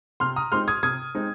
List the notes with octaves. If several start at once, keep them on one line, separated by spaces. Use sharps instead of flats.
C3 C6 F6
A#5 D#6
G#3 C4 D#4 C6 F6
D#6 G#6
C3 D#6 G#6
G#3 C4 D#4